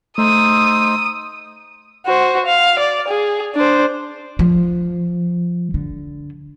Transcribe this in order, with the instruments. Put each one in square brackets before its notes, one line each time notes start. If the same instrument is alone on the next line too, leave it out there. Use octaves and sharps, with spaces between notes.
[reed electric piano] A3 [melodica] D#4 C5 E6 [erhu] D#6
[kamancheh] F#4 C5
F5
D5
G#4
D4 C5
[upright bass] F3
D3